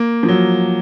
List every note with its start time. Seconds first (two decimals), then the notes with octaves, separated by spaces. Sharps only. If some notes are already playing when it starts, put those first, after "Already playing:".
Already playing: A#3
0.23 F3
0.28 F#3